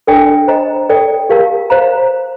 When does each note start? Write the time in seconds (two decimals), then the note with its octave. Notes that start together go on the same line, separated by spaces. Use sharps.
0.07 D4 A4 D5 G5
0.48 C5 D#5 A#5
0.89 A4 D5 G5
1.29 G4 A#4 F5 A5
1.70 C5 F5 A#5